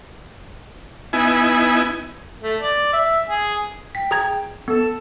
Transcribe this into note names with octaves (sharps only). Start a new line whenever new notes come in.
B3 D#4 E4 G#5
A3
D5
E5
G#4
G5 B6
G#4 A#5 G#6
B3 A4